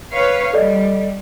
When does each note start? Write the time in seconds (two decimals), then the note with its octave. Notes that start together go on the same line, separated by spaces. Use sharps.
0.12 B4 C#5 F5
0.53 G3 A4 D5 D#5